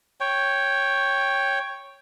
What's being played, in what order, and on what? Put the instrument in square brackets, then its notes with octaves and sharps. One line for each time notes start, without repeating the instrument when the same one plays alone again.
[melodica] C#5 G5